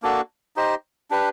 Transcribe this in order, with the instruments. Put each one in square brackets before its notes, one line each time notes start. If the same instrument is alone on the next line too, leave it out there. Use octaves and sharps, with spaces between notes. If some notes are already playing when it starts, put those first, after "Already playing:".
[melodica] A#3 D4 F#4 A4
D#4 G4 C5 D#5
D4 G4 B4